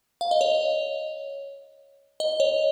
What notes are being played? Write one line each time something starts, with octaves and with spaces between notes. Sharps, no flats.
F5
D#5
C#5
D#5
C#5